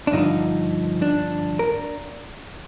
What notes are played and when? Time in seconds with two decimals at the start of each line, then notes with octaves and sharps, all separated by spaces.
0.07 D4
0.12 G2 D3 F3 D#4
1.02 D4
1.59 A#4